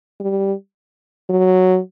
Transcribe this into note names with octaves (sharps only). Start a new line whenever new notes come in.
G3
F#3